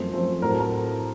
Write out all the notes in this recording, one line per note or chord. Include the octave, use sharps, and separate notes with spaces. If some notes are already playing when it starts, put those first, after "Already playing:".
Already playing: F#2 F3 A3 C4 C5
F#2 F3 A3 C4
A2 F#3 C4 A#4
A4
A#4